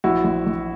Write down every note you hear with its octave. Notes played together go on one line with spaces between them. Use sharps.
A#1 E4 F#4
A#1
A#1